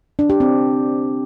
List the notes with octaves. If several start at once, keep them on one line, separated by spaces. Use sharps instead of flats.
D4
G4
C4